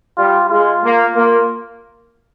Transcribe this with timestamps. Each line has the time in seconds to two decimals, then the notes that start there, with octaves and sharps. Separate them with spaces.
0.17 G3 F4
0.50 G#3 F4
0.83 A#3
1.15 A#3